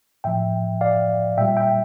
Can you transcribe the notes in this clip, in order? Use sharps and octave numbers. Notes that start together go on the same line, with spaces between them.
A2 F3 E5 G5
D5 F5
A#2 G3 E5 G5
E5 G5